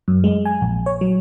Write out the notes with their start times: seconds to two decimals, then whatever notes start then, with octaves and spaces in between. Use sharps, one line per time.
0.08 F#2
0.24 G#3
0.45 G#5
0.61 A#1
0.86 C#5
1.01 F#3